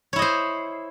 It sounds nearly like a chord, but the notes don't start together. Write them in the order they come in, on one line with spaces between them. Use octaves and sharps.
C#5 E4 D#5 C5